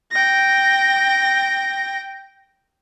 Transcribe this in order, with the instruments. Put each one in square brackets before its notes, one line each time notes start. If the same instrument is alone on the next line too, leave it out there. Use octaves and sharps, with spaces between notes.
[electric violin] G5 A#6